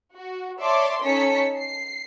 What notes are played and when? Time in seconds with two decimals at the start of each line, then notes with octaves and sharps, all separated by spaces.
0.14 F#4
0.61 C#5 D5 E5 A5 C6 D6
1.04 C#4 D#4 A4 A5 B6 C#7
1.59 C7